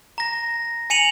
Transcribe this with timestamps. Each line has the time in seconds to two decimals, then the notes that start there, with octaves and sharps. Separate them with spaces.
0.18 A#5 A#6
0.90 G#5 C#7 D#7 F7 F#7